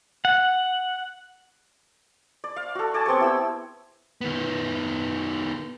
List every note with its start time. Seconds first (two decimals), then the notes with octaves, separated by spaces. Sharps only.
0.25 F#5
2.44 D5
2.56 F5
2.75 F#4 A4
2.94 D5 G#5 A5
3.06 B3 C4 G4 C#5
3.20 E4 G4 E6
4.21 D#3 B3